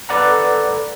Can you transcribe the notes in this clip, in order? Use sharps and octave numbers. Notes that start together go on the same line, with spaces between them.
A4 B4 D5 F#5 A#5